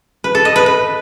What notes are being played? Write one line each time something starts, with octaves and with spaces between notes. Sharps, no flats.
B4
A4
D#5
B4
B4